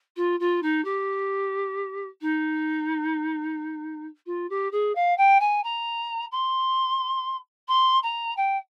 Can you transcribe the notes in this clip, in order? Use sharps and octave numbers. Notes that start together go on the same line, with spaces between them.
F4
F4
D#4
G4
D#4
F4
G4
G#4
F5
G5
G#5
A#5
C6
C6
A#5
G5